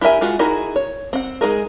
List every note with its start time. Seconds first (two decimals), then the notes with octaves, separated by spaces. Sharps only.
0.01 E4 G4 A#4 E5 G#5
0.21 G#3 F4 F#4
0.39 D#4 E4 F#4 G#4 A#4
0.76 C#5
1.13 C4 F#5
1.41 G#3 A3 D#4 G#4 A#4